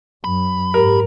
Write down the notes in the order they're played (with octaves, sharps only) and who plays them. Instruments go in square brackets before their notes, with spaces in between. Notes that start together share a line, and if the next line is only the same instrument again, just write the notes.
[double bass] F#2 [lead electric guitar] B5
[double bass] G#2 [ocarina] G4 [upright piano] A#4